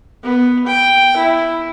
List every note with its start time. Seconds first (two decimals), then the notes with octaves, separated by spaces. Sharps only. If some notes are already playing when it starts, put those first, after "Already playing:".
0.23 B3
0.67 G5
1.17 E4